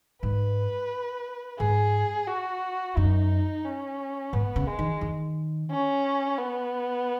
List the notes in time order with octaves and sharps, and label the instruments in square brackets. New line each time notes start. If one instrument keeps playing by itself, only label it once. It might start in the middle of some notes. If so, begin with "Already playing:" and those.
[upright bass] G#2 [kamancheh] B4
[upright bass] G#2 [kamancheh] G#4
[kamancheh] F#4
[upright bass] F#2 [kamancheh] D#4
[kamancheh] C#4
[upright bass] G#2 [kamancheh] B3
[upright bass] C#3
[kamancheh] G#3
[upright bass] D#3
D#3
[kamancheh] C#4
B3